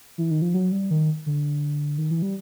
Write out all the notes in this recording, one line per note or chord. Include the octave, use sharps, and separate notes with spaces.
E3
D#3
F3
F#3
G3
D#3
D3
D#3
E3
G3